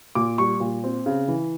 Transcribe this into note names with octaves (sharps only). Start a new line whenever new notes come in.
A#2 D6
G3 C#6
A#2
C4
C#3
E3